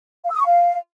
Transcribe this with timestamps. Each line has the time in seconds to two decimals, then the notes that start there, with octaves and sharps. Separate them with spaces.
0.25 F5
0.30 E6
0.35 D#6
0.40 C#6
0.46 F5